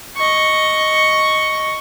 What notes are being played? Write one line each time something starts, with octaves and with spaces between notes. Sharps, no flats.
D#5 C#6